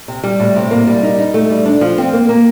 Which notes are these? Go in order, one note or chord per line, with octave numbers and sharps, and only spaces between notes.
C3
G3
A2
C3
A#3
G3
D#4
D#4
A3
G3
D4
F3
C4
A#3
A#3